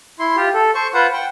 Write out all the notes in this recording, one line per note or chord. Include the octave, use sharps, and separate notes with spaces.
E4 C6
F4 G4
A4
C5 C#6
F4 B4 C5 F#5
F#5 G5